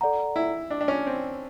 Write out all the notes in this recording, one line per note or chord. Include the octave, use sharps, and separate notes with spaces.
A4 D5 F#5 A#5
E4
D4
D4
C#4
C4